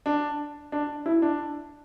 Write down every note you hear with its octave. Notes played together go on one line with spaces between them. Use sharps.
D4
D4
E4
D4